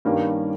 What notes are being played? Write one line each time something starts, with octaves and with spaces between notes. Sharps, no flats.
G2 D#3 G3 A#3 C#4